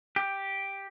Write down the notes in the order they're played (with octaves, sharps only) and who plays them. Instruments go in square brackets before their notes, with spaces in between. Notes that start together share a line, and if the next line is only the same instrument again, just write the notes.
[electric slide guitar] G4